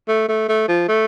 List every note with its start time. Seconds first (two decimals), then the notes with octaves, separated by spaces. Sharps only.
0.08 A3
0.28 A3
0.49 A3
0.68 F3
0.88 A3